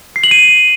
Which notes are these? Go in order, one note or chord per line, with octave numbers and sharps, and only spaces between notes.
C7
F#7
D#7